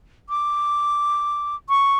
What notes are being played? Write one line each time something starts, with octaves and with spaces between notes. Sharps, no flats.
D6
C#6